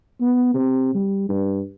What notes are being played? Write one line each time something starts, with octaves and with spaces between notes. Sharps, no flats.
B3
C3
G3
G2